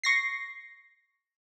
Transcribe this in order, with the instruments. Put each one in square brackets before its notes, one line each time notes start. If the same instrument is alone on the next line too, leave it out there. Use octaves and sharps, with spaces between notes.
[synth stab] C#6 A#6 C7